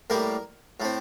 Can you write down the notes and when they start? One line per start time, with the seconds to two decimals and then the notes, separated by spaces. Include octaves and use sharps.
0.10 A2 G3 A#3 A#4
0.80 A2 A3 C4